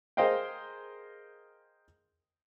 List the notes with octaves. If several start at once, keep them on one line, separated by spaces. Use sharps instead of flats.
G#4 A#4 C5 D#5 F5 G5